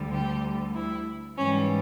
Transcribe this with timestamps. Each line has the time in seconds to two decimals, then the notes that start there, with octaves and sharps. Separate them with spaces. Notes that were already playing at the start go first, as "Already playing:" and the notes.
Already playing: D2 D3 G3
0.12 G4
0.75 E4
1.37 G#2 E3 G3 C#4